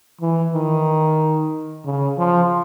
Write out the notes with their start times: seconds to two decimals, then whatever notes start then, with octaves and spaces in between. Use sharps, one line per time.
0.21 E3
0.54 D#3
1.85 C#3
2.18 F3